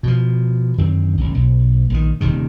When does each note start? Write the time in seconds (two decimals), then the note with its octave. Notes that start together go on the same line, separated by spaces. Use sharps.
0.03 B2 F3
0.78 F#2 D3 D#3 C4
1.18 G#1 C#2
1.34 B1
1.90 A#1 D#3
2.21 D#1 D#2 C3 D#3